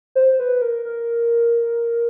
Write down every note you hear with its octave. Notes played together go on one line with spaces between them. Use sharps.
C5
B4
A#4
A#4